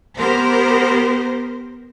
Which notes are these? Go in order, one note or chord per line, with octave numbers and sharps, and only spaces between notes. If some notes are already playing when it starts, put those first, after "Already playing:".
B3 G4 A#4 C5